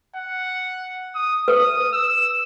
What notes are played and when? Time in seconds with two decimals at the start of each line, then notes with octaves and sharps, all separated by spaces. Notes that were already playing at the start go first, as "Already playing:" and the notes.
0.16 F#5
1.15 D#6
1.48 B4 D#6
1.92 E6